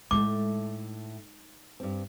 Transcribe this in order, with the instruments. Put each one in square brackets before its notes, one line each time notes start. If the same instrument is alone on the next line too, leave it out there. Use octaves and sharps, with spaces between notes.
[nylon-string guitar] A2 A3 [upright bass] G#3 D#4 [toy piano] D6
[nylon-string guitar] G2 C4